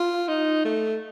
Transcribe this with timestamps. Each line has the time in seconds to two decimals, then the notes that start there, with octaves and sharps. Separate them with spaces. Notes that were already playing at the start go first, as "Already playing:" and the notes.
Already playing: F4
0.28 D#4
0.65 A3